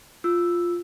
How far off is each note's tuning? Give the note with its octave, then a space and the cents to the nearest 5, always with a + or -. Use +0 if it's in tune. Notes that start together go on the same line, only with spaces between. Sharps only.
F4 +0 E6 +0